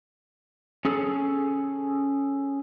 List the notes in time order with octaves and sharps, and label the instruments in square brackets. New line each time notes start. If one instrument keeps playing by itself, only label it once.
[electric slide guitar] C#4 G#4 A4